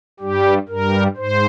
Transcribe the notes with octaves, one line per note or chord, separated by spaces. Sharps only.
G2 G3 G4
G2 G3 A#4
G#2 C5